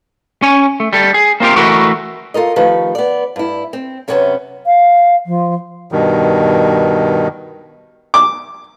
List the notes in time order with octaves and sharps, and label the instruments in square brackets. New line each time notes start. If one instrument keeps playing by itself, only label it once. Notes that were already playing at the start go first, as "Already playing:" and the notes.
[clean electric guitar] C#4 G#5
A3
G3 A4
G#4
A#3 C4 F4 G4 A#4
E3 A3 F#4 A#4 B4
[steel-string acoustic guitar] F4 A4 A#4 D#5
D#3 F3 A3 G4 B4
B3 D5
G2 E4
C4
F#2 C3 B3 C#4 G4 C5
[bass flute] F5
F3
[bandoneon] G2 B2 D#3
[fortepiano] D6